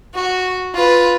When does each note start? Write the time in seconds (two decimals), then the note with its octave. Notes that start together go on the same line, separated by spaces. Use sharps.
0.15 F#4
0.74 F4 B4